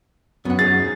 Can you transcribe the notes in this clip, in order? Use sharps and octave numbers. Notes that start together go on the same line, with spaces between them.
F#2 B3 F#5
D#4 G#4 A6